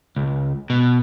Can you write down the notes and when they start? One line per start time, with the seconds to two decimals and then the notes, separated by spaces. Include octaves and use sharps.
0.16 C#2
0.70 B2